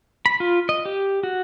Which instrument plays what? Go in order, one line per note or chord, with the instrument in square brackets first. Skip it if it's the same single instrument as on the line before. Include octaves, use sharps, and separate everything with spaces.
[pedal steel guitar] B5
F4
D#5
G4
F#4